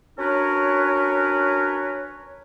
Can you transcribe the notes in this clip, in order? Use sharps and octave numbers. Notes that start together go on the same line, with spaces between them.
C#4 D4 F#4 A#4 B4 C#5